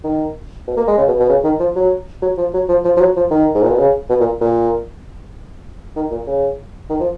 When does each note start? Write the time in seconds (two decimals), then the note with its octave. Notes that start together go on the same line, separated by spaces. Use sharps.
0.04 D#3
0.67 B2
0.77 A#3
0.88 G#3
0.98 C#3
1.08 B2
1.19 B2
1.29 C#3
1.44 D#3
1.60 F3
1.76 F#3
2.22 F#3
2.37 F3
2.54 F#3
2.69 F3
2.85 F3
2.97 F3
3.00 F#3
3.16 F3
3.31 D#3
3.55 G#2
3.63 A#2
3.70 B2
3.78 C#3
4.09 B2
4.20 A#2
4.41 A#2
5.96 D#3
6.11 A#2
6.27 C#3
6.90 D#3
7.00 F3